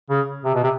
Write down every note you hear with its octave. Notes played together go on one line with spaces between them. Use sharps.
C#3
C3
B2
C3